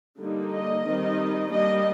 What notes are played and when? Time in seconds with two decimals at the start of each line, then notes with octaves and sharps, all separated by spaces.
0.19 D3 G3 A#3 D#4
0.52 D#5
0.85 D#3 G3 C4 D#4
1.51 G3 A#3 D4 D#5